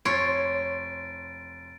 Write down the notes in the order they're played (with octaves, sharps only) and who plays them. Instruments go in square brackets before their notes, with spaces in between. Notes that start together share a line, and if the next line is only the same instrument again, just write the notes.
[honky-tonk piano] F1 C6 C7 [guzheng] C#5 [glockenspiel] A6 D7